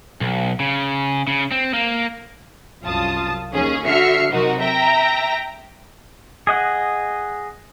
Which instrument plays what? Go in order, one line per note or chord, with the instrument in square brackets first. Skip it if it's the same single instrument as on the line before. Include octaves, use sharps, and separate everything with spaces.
[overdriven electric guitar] B1
C#3
C#3
C4
A#3
[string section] C2 F#2 F4 A5 D#6
D#2 C#4 G#4
D3 F#4 E5 F6 C7 C#7
C3 F#3 D#4 F#4 A#4
E5 G5 A#5 A#6
[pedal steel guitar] G#4 D#5 F#5